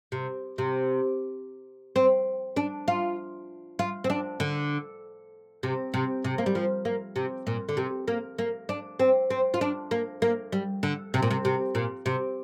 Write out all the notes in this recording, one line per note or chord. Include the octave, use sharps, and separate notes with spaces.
C3
C3
C4
D4
F4
F4
C4
D4
D3
C3
C3
C3
A#3
G3
F3
A#3
C3
A#2
D3
C3
A#3
A#3
D4
C4
C4
F4
D4
A#3
A#3
G3
D3
C3
A#2
C3
C3
A#2
C3